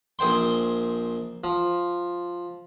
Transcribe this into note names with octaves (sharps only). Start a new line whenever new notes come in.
A#1 G#4 C5 G5 C6
F3